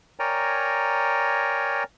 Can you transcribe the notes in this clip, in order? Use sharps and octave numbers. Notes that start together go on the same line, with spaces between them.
A#4 C#5 D5 G5 G#5 A#5